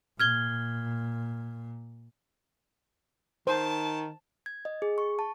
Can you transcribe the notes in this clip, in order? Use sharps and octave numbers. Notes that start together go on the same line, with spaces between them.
A#2 F6 G#6 G7
D#3 C5 A5
G#6
D#5
G#4
C#6
A5